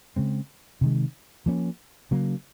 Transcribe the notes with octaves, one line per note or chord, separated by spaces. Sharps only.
C#3 G#3 C4
C3 D#3 G#3
F3 A#3 C#4
C#3 F#3 A#3